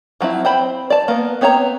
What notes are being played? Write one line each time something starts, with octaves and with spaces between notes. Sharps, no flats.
F3 F#3 C4 E4
C4 C5 B5
D5 A5
A#3 B3
B3 C4 C#5 A5 A#5